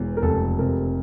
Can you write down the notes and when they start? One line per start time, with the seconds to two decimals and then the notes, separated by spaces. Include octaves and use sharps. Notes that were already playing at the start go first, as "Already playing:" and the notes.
Already playing: E1 E2
0.17 A#4
0.22 F1 A4
0.59 C3 A#4